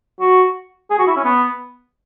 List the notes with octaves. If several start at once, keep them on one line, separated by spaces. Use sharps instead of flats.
F#4
G#4
F#4
E4
C#4
B3